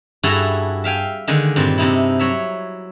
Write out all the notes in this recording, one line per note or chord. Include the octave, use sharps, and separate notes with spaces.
G2 E4 F#4 G#4 A4 A#5
E5 F5 G5 G#5
D3 D#3 G#3
G2 A#2 C4
C3 D#4 E4
F#3 C#5 E5